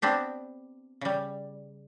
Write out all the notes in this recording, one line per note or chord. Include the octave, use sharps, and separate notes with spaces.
B3 C4 D4 G4
C#3 G3